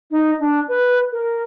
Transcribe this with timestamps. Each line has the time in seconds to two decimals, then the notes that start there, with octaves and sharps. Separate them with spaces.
0.11 D#4
0.40 D4
0.68 B4
1.12 A#4